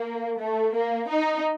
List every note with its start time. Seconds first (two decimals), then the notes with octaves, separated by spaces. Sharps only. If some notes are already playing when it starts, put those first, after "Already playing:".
Already playing: A#3
0.40 A3
0.75 A#3
1.09 D#4